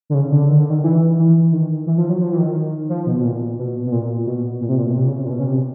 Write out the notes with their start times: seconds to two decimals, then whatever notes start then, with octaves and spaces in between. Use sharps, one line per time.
0.10 D3
0.14 C#3
0.32 D3
0.49 D#3
0.59 D3
0.70 D#3
0.84 E3
1.18 E3
1.52 D#3
1.86 E3
1.98 F3
2.09 F#3
2.21 F3
2.32 E3
2.38 D#3
2.89 F3
3.06 B2
3.19 B2
3.24 A#2
3.58 B2
3.86 B2
3.92 A#2
4.26 B2
4.61 A#2
4.69 C3
4.78 A#2
4.86 B2
4.95 C3
5.06 C#3
5.18 C3
5.25 A#2
5.30 B2
5.40 C#3
5.47 C3